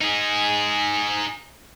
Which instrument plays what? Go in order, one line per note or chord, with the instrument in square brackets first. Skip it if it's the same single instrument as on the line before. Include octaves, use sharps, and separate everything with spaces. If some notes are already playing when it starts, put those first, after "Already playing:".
[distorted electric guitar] D#4 G#4